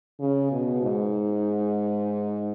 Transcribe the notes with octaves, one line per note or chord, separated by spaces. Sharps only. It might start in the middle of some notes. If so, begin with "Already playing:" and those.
C#3
B2
G#2